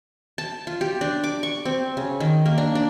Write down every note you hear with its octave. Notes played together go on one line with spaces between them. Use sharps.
A5
F4
G4
D4
D6
C#6
C4
C#3
D#3
A#3
D4
D4